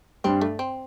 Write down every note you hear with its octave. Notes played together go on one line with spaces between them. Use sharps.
G2 G3 C4 D4
A3
C4